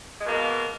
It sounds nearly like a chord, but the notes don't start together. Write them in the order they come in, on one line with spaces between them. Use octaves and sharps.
G#3 B2 A#3